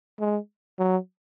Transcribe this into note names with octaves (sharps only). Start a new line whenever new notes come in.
G#3
F#3